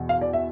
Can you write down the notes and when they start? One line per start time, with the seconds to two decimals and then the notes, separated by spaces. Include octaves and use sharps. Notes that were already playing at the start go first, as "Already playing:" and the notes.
Already playing: E2 B2
0.09 F5
0.21 D5
0.33 E5